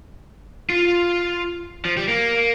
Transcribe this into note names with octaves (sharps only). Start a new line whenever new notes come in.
F4
F3
G3
A#3